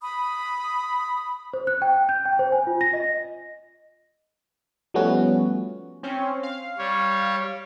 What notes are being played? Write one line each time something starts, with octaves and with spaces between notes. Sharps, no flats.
B5 D#6
C5
F#6
G5
G6
G5
C5
G#5
F4
A#6
D#5
F3 G3 A3 B3 C#4 F#4
C4 C#4
F5
G3 C#5